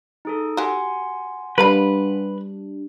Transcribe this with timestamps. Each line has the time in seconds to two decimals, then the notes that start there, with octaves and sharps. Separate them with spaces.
0.25 D#4 G#4 A4
0.57 F#4 G4 F#5 G#5 C6
1.58 G3 D4 A#4 B4 F5 B5